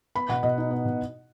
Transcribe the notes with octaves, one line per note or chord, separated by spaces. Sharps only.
B3 B5
B2 F#5
B2 D#5
D#4
B3
B2